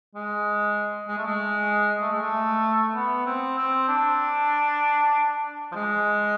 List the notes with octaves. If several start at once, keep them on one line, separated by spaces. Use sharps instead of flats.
G#3
G#3
A3
G#3
A3
G#3
A3
B3
C4
C4
D4
F3
G#3